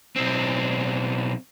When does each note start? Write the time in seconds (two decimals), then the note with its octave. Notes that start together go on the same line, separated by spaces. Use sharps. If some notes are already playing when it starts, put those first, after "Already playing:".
0.16 B1 C4